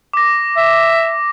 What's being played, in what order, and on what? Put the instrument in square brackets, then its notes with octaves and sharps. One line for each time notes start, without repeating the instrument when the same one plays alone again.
[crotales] D6 A#6
[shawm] E5